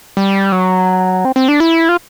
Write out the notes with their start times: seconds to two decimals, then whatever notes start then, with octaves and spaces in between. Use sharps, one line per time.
0.17 G3
0.52 F#3
1.25 C4
1.36 C4
1.48 D4
1.60 E4
1.89 F4